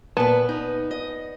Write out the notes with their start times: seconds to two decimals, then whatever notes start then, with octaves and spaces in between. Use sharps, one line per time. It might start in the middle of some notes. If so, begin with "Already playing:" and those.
0.17 A#2 B3 B4 A5
0.49 D#4
0.91 D#5